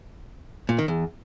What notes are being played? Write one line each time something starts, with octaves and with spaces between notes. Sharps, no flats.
A#2
D#3
E2